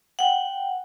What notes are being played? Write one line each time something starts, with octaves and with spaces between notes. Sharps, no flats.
F#5 G5